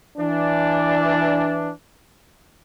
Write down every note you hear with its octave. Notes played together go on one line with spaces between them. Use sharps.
E3 D4